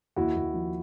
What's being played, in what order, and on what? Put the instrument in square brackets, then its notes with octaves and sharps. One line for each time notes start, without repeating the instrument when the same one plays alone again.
[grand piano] D#2 E4 F#4
D#2
F3